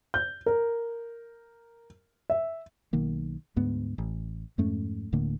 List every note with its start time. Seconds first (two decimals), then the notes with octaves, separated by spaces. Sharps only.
0.14 G6
0.46 A#4
2.30 E5
2.93 B1 D#3 A#3
3.56 D2 G#2 B3
3.98 A1
4.58 F2 G#2 A3 C#4
5.12 D1 A2 D3 A#3